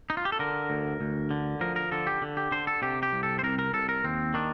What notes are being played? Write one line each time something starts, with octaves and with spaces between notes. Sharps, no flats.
D#4
F4
G4
A4
D3 A#4
D2
D2
D3
F3 A#4
A#4
D3 A4
G4
D3
G4
D3 C5
A4
C3 G4
G4
C2
A4
C5
C2 A#4
A#4
C2 A4
A#4
D#2 C4
D#3 D4